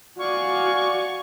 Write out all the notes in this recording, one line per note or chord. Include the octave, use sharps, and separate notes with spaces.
F#4 D5 F5 G#5 C#6